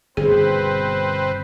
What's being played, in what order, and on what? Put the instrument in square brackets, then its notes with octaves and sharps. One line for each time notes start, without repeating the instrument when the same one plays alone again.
[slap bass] G1 B2 [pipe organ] C4 B4 C5 [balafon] G#4